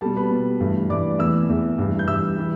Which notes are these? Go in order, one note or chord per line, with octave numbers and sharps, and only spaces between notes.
B2 G3 A4 A5
B4 B5
B2 G3
G2 E3 A3
G2 E3 A3 D5 D6
E2 E3 A3 E5 E6
E2 E3 A3
G2 E3 G3
G6
G2 E3 G3 E5 E6
E3 G3